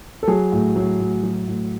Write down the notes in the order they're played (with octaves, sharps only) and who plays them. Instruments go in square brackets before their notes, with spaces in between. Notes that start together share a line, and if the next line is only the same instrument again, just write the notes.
[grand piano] A4
F#3 G#4
A2
F#3
A2
F#3
A2